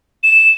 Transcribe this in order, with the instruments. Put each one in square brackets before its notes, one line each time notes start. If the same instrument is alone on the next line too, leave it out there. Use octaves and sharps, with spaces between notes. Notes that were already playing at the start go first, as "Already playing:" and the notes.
[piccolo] E7